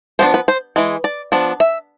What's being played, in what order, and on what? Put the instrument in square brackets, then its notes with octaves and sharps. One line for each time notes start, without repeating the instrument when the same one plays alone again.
[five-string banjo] F3 B3 D4 C5
B4
C5
E3 G#3
D5
F3 B3 D4
E5